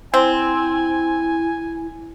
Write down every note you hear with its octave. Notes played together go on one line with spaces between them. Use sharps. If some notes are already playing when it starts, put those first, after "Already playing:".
C4 E4 G#5